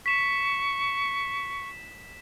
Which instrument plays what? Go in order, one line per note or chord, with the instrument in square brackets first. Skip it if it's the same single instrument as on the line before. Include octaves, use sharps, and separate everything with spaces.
[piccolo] C#6 [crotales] B6 E7